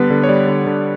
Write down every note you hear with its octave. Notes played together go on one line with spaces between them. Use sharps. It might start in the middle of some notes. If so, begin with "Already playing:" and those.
Already playing: D3 G3 B3 B4
D3
C#5
G3 D5
D3
D3